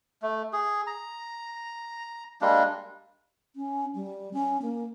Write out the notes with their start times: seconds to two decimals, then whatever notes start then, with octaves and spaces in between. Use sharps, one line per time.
0.22 A3
0.53 G#4
0.87 A#5
2.41 G3 G#3 A#3 D4
3.56 C#4
3.95 G3
4.33 C#4
4.62 A#3